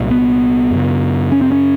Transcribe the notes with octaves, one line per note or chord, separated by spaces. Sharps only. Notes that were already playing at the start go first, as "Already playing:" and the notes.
Already playing: C2 A#2
B3
F#2 C#3
C#4
C4
C#4